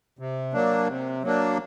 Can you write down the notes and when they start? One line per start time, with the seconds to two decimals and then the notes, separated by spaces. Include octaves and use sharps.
0.19 C3
0.53 F#3 A#3 D4
0.88 C3
1.23 F#3 A#3 D4